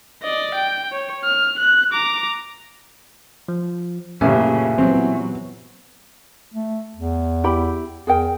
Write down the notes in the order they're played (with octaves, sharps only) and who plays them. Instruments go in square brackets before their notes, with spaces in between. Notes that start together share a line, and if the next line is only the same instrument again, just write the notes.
[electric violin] D5 D#5
G5
C#5
F6
F#6
A#5 D6
[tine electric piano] F3
[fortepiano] A1 F#2 [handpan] A#2 G4 [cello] C#3 A#3 [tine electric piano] E5 G#5
[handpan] E3 B3 [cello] F#3 [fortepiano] C4
[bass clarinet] A3
E2
[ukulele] E4 G4 B5
[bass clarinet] E2 [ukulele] G#4 A#4 G5